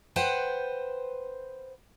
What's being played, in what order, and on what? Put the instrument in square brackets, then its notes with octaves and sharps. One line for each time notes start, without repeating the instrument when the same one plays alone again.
[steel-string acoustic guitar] B4 C5 F#5 G5